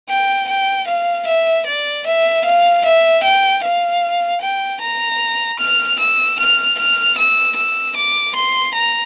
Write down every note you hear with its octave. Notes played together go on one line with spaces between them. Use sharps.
G5
G5
F5
E5
D5
E5
F5
E5
G5
F5
G5
A#5
F6
E6
F6
F6
E6
E6
D6
C6
A#5